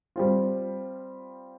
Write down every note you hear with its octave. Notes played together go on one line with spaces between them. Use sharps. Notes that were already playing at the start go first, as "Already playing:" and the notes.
G3 C4 F4